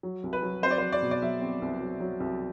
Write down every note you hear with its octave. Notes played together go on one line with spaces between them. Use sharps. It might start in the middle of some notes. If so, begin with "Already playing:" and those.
F#3
C2
B4
F#3
C4 C5
D5
F#3 C5
D5
B2
D5
F#3 E5
C4
C2
F#3
F#3
C2